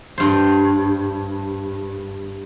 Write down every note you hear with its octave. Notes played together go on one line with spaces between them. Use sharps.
G2 C5